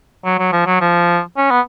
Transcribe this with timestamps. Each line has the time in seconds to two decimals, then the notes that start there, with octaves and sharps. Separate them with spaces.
0.25 F#3
0.39 F#3
0.52 F3
0.66 F#3
0.81 F3
1.37 C#4
1.51 B3